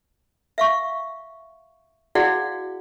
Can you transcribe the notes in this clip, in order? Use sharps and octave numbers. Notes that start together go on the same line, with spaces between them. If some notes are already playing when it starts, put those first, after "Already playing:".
E5 F5 C#6
E4 F#4 G#4 D5 F5 F#5